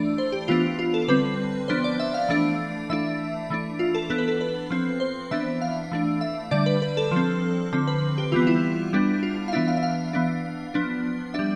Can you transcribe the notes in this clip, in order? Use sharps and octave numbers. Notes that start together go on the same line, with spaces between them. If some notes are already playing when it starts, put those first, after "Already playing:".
Already playing: E3 A3 D4 D5
C5
G4
E3 B3 D4 F4
F4
A4
D3 G3 C4 B4
F3 B3 D4 C5
D5
E5
F5
E3 A3 D4
E3 A3 D4 E5
E3 A3 D4
F4
A4
E3 B3 D4 A4
B4
A4
B4
F3 C4
C5
E3 B3 D4 E5
F5
E3 A3 D4
E5
D3 G3 D4 D5
B4
B4
A4
F3 C4
D3 F3 C4
B4
G4
E3 G3 B3 F4
E4
G3 B3 D4
F4
F5
E3 B3 D4 E5
F5
E5
F5
E3 B3 D4
F3 B3 D4
G3 D4 E5